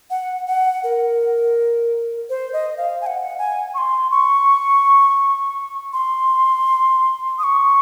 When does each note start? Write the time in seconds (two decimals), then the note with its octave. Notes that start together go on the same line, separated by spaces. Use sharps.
0.10 F#5
0.47 F#5
0.84 A#4
2.30 C5
2.53 D#5
2.77 F5
3.01 G#5
3.06 F#5
3.38 G#5
3.74 C#6
3.78 C6
4.11 C#6
5.93 C6
7.39 D#6
7.44 C#6